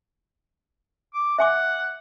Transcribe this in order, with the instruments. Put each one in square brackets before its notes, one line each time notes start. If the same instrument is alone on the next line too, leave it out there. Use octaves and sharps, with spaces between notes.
[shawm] D6
[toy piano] E5 G#5 D6 [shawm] F#5